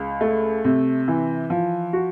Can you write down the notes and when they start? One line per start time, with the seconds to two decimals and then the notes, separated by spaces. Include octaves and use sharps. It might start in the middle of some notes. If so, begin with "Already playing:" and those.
Already playing: C#2
0.21 A3
0.64 C3
1.08 E3
1.50 F3
1.93 F#4